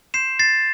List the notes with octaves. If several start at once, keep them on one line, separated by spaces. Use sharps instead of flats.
C6 G6 C7 E7
A6 C7